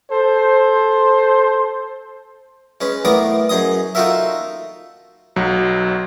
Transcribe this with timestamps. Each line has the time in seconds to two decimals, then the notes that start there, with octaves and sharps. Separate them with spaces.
0.11 A4 C5
2.81 G#3 C#4 B4
3.05 A2 B3 A#4 D5 D#6
3.49 F#2 G#4 D#5 D#6
3.95 D#4 F4 F#4 A4 A#4 E5
5.36 B1 F#3